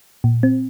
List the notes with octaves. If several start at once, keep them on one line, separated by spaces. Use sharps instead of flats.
A#2
C4